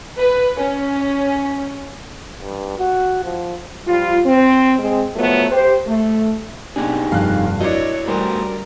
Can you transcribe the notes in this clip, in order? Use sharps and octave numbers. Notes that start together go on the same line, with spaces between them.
B4
C#4
G2
F#4
F3
F3 G3 F4
C4
G#3 C4
F3 F#3 A3 B3
G4 C5
A3
B2 C4 D4 D#4 G4 G#4
F1 G2 F5 F#6
F#3 D4 E4 A#4 C#5 D#5
G3 A3 B3 A#4 C5